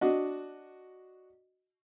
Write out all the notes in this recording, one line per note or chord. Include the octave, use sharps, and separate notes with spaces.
D4 F#4 D#5